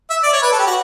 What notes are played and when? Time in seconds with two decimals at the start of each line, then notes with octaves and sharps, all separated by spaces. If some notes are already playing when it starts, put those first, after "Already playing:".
0.10 E5
0.23 D5
0.33 C#5
0.43 B4
0.52 A4
0.59 G4
0.67 F#4